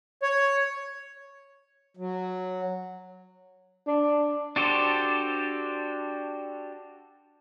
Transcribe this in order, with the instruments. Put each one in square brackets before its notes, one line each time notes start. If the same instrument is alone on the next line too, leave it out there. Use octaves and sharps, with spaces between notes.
[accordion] C#5
[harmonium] F#3
[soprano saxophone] D4
[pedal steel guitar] D4 F#4 G4 A4 C5